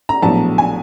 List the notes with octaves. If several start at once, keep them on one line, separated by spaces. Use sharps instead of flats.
A#5
A#1 A2 F#3 B3 A5
G#5